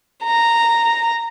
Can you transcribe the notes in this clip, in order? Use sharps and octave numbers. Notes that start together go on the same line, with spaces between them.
A#5